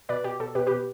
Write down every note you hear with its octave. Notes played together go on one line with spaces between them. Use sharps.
B2 B4 D5
B2 G4
B2 A4
B2 G4 B4
B2 G4 B4